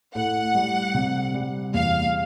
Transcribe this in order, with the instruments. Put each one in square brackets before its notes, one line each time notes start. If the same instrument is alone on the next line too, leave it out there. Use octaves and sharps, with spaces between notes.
[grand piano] A2 [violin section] F#5
[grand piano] G3
C3
G3
[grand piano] E2 [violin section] F5